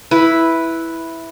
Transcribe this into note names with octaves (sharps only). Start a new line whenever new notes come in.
E4 B4